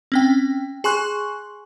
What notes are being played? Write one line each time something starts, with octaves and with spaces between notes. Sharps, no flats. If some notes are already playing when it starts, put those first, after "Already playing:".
C4 C#4 G5
G#4 G#5 C6 C#6 F#6